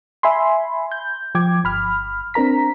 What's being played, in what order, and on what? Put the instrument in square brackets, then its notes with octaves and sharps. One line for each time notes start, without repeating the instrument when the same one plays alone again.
[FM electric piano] E5 G#5 B5 C6
G6
F3 G5 D6 G#6
G1 B5 F6
C4 D4 A#4 A#5 B6